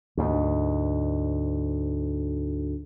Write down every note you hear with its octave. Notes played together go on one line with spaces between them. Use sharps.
D2 G#2